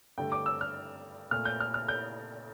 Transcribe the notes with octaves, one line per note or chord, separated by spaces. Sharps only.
G2 D3 A3 G5
D6
E6
F6
A#2 A3 F6
G6
F6
F6
G6